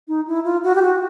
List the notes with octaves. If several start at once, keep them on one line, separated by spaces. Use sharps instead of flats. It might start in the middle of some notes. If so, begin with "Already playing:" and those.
D#4
E4
F4
F#4
G4
F#4